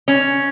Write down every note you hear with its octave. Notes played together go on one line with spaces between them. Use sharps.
C#4